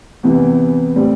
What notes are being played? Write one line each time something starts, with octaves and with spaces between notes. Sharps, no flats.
E2 C3 E3
A2 G3 C4